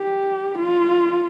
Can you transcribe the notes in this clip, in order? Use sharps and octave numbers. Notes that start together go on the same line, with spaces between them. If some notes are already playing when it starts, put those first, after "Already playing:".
Already playing: G4
F4